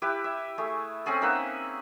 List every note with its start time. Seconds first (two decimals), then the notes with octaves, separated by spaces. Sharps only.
0.02 E4 G4 B4
0.24 E5
0.58 A3 G#4
1.06 C4 C#4 G#4 A4
1.21 A#3 D#4 E5 F#5